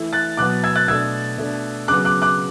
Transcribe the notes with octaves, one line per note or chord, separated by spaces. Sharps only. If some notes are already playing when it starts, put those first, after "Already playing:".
Already playing: E3 A3 E4
F#6 A6
B2 F#3 B3 D6 F#6
E6 G#6
F#6 A6
B2 A3 D4 E6 G#6
B2 A3 D4
C#3 F#3 B3 D6 F#6
D6 F#6
D6 F#6